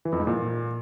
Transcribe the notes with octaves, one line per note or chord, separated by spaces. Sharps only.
E3
F2
G#2
A#2